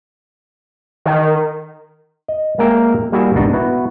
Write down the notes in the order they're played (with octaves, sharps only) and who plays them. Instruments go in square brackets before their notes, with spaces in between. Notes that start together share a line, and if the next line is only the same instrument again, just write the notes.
[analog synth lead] D#3
[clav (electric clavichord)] D#5
G#3 A#3 C#4 A#4 E5 G5
G3 A#3 E4 F#4 G#4 E5
G#1 C#2 B2 D4 D#4 F#4
B3 E4 F#4